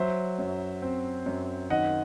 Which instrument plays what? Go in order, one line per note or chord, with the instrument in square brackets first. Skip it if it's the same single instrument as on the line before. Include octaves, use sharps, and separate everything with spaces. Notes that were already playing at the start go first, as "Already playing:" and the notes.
Already playing: [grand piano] F#3 C5 E5
F#2
C4
F#2
D#3 D#5 F#5